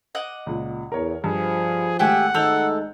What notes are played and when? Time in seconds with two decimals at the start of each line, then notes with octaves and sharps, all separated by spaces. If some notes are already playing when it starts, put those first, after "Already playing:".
0.15 D#5 F#5 D6
0.46 C#2 A#2
0.92 E2 A#4 C#5
1.24 G2 F3 G#4
1.99 G#1 G#3 A3 G4 E5 F#5 G#5
2.34 G#1 G#3 A3 D#4 A4 E6 G6 F7